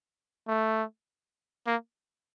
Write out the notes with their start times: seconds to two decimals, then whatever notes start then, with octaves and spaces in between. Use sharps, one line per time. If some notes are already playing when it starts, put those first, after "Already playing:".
0.48 A3
1.67 A#3